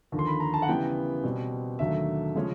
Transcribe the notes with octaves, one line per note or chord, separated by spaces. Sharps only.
D#2 D3 F3
C6
B5
A#5
A5
F#5
C#3 E3 G3 B3 G5
B2 G3 C4
D#2 D3 F#3 A3 E5
C#3 F3 G#3 C#4